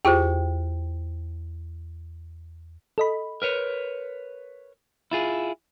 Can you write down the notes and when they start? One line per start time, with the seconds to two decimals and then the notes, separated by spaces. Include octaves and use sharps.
0.05 E2 F4 G4 G#4 C5 G5
2.98 A4 D#5 B5
3.42 A#4 B4 C#5
5.11 E4 F4 G#4